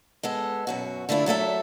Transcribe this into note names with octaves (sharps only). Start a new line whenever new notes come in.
G#3 B3 A4
F#2 B2 F#4
D3 A3 D4 E4 F4
F#3 A3 A4 E5